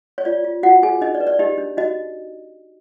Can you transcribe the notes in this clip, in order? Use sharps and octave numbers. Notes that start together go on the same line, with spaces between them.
C#5
F4 D5
F4
F4 F#4 F#5
F4 G#4 G#5
D4 D#4 D#5
D5
B4
D5
D#4 G4 D#5
D4
D#4 F#4 D#5